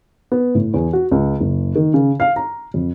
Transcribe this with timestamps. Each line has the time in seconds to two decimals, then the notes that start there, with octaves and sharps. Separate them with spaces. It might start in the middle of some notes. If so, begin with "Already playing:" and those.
0.32 B3
0.55 A2
0.74 E2
0.93 F#4
1.11 C#2
1.40 F#1
1.75 D#3
1.94 C#3
2.20 F5
2.36 A#5
2.74 F2